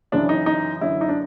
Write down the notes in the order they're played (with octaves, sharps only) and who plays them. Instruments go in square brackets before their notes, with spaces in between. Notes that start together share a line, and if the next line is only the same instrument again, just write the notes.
[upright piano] F#2 C#3 E3 D4
D#4
D#4
F#2 D3 E4
D#4
D4